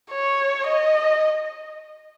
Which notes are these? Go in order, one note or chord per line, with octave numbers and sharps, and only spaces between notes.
C#5
D#5